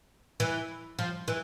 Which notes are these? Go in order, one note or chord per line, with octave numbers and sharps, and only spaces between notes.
E3
F3
E3